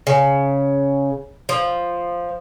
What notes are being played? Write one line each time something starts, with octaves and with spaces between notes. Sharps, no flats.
C#3
F3